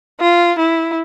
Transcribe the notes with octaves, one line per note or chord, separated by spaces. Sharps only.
F4
E4